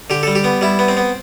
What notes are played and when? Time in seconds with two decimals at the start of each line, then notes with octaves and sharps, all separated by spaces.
0.10 D3 G4
0.23 G3 A4
0.35 G4
0.44 B3
0.61 G3 E4
0.79 B3
0.89 C4
0.97 B3